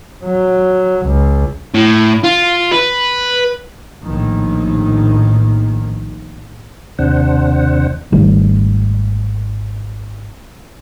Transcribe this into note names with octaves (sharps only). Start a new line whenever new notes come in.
F#3
C#2
A2
F4
B4
A#1 A2 D#3
D#2 C3 D4 C5 F#5
G#1 D#3 G3 A3